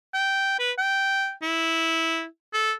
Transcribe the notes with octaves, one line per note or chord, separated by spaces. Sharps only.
G5
B4
G5
E4
A4